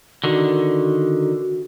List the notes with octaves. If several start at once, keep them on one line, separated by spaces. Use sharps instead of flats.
D3 D#3 F#4